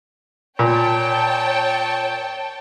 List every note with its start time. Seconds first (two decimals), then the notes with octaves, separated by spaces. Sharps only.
0.59 A#2 C#5 G5 A5